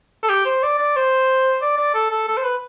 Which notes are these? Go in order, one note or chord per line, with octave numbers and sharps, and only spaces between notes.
A4
G4
C5
D5
D5
C5
D5
D5
A4
A4
A4
C5
B4